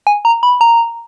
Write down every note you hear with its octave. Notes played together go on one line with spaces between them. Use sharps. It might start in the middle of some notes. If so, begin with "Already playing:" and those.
G#5
A#5
B5
A#5